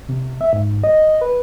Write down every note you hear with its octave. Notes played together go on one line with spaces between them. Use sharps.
C3
E5
G#2
D#5
B4